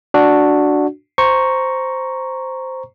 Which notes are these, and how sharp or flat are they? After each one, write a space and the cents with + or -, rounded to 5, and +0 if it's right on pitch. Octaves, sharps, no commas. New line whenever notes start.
D4 +0 F#4 +0
C5 -5 A#5 +0 C#6 +0